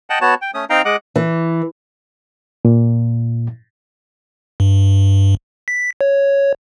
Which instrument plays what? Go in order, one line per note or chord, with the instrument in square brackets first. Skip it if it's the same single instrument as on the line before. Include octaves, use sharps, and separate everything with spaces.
[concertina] D#5 F#5 G5 A5
B3 F#4 C#5 A5
G5
A3 C#4 D#6
C4 D#4 F5 G5 A#5
G#3 D#5 F#5 D6
[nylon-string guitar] E3
[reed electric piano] A#2
[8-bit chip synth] G2
B6
C#5